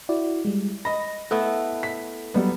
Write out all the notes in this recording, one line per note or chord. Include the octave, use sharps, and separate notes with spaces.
E4 F#4 D5
G3 G#3
D#5 B5 A#6
A3 B3 E4 A4
B6
F#3 G3 B3